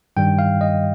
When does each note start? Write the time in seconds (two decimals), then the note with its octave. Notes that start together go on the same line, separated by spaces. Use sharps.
0.17 G2 D#3 G3 G5
0.39 F5
0.61 D#5